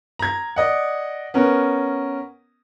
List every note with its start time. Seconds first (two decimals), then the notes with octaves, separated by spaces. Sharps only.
0.19 A#5 G#6
0.56 D5 D#5 F#5
1.34 B3 C#4 A#4